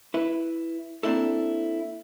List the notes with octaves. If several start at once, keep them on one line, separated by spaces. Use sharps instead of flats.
E4 B4
A#3 C4 D4 E4 A4